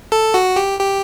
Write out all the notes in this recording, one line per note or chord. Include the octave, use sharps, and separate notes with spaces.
A4
F#4
G4
G4